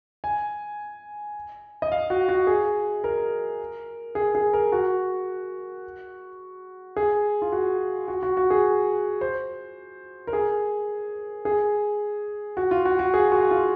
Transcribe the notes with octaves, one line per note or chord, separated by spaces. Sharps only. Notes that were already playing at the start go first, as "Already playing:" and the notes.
G#5
D#5
F5
F#4
F#4
G#4
A#4
G#4
G#4
A#4
F#4
G#4
F4
F#4
F#4
F#4
F#4
G#4
C5
A#4
G#4
G#4
F#4
F4
F#4
F#4
G#4
F#4
F4